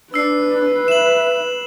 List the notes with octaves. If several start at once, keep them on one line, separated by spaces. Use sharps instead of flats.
D4 B4 E6 C7
E5 E7 F#7